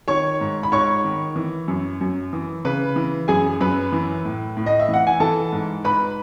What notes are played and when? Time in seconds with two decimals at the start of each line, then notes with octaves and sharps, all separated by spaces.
0.08 D#3 C#5 C#6
0.41 G#2
0.63 B5
0.72 G#2 C#5 C#6
1.04 D#3
1.36 E3
1.68 F#2
2.01 F#2
2.33 E3
2.65 C#3 B4 B5
2.96 E3
3.28 F#2 G#4 G#5
3.60 F#2 B4 B5
3.92 E3
4.25 A2
4.57 A2
4.66 D#5
4.80 E5
4.88 E3
4.94 F#5
5.07 G#5
5.20 E3 A4 A5
5.52 G#2
5.84 G#2 B4 B5